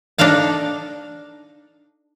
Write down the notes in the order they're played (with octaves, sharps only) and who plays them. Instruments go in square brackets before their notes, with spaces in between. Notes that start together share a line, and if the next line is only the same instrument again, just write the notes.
[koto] D4 D#4 A4 F5 A5